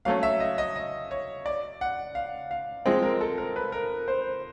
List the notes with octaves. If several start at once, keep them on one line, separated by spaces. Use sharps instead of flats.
F#3 A3 C#4 F5
E5
D#5
D#5
D#5
C#5
D5
F#5
F5
F5
F3 G#3 C4 D#5
A#4
A4
A#4
B4
A#4
C5